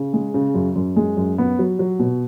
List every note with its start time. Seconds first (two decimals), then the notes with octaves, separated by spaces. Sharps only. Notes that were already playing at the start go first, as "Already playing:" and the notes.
Already playing: C#3
0.13 G#3
0.34 C#3
0.54 F#2
0.75 F#2
0.96 G#3
1.17 F#2
1.38 B3
1.59 F#3
1.79 F#3
1.99 B2